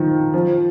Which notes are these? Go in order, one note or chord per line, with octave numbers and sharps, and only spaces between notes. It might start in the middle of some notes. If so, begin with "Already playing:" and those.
Already playing: D#3 F3
F3